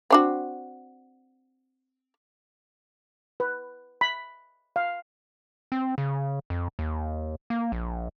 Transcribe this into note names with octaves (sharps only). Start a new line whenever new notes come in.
C4 D4 F#4
B4
B5
F5
C4
C#3
F2
D#2
A#3
A#1